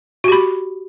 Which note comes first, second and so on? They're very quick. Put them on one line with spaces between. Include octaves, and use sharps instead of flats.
F#4 G4 B5